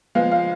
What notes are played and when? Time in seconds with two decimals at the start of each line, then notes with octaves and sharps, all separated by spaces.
0.15 F3 G#3 B3 F5
0.32 F5